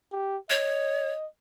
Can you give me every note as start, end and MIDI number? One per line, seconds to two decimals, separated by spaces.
0.12 0.37 67
0.50 1.11 73
0.50 1.26 75